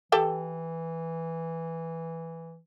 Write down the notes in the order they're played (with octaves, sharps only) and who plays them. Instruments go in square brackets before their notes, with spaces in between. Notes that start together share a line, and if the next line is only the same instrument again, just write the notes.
[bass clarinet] E3 [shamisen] G4 A4 G5